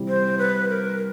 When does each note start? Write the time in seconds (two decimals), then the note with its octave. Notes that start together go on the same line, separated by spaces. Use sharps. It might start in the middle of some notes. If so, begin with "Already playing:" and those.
Already playing: C3 E3 G3
0.08 C5
0.39 B4
0.70 A#4